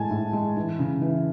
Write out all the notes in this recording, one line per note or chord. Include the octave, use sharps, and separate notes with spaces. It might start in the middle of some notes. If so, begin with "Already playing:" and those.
Already playing: A2 G#3 G#5 A5
A2
G#3
E3
C#3
E3